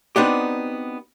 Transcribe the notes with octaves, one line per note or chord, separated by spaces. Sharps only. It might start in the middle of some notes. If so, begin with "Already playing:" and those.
B3 C4 D4 D#4 F#4 G4